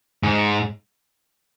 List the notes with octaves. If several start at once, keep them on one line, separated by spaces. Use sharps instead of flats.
G#2